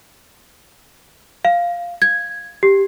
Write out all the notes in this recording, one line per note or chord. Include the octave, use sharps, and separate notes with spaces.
F5
G#6
G4